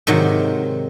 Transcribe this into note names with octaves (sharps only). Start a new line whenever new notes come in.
G#2 C3 D#3 F#3